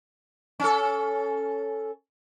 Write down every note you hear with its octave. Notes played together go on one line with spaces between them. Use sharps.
C#4 A4